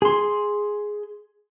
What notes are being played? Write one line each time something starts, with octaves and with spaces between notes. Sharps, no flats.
G#4 C6